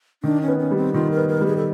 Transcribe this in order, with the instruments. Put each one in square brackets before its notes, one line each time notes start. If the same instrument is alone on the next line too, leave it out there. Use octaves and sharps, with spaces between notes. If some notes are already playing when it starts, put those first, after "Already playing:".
[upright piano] D#3 [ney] D4
[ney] C#4
[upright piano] B3
[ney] C#4
[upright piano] G3
[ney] C4
[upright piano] D#3 [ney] F4
[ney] A#4
[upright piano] B3
[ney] A#4
[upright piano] G3
[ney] G#4
A4